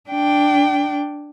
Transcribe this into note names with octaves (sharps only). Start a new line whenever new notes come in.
D4 G5